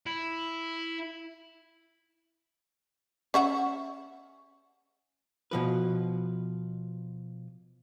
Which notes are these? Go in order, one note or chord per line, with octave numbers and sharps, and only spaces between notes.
E4
C#4 E5 F#5
B2 F3 B4